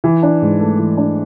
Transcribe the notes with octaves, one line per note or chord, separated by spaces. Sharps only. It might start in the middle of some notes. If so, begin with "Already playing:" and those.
E3
D4
G#2
A3
E3
D4